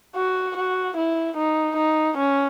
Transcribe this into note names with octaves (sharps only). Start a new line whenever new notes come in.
F#4
F#4
E4
D#4
D#4
C#4